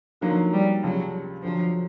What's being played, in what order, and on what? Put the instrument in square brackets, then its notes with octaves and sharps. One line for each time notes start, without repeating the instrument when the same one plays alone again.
[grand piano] D3 F#3 A#3 D#4 [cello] F3
[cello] G3
[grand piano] C#2 C3 F3 [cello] F#3
[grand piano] D2 D3 F#3 [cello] F3